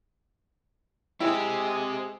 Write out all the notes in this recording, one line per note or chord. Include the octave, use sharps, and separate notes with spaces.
G#3 C4 E4 G4